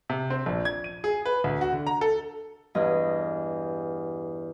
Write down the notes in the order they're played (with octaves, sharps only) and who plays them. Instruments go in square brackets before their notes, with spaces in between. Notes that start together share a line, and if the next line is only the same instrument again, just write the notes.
[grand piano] C3
C4
A#1
G#6
D#7
G#4
B4
D2
F#4
D3
A#5
A4
[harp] E2 G2 D#5